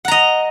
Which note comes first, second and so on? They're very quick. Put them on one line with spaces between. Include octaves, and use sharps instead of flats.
F#5 A#5 D#5